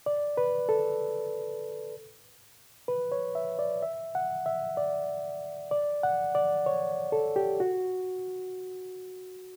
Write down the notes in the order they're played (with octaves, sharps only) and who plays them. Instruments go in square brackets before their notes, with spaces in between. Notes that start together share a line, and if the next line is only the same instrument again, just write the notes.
[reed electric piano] D5
B4
A4
B4
C#5
E5
D5
E5
F#5
E5
D5
D5
F#5
D5
C#5
A4
G4
F#4